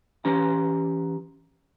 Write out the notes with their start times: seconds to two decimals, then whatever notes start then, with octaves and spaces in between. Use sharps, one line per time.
0.25 E3 C#4 G4 A#5